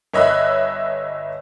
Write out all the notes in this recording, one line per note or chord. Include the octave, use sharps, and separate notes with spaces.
G1 C#5 D#5 E5 B5 F#6